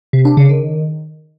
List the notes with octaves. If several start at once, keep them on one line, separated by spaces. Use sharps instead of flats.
C3
D4
C#3
D#3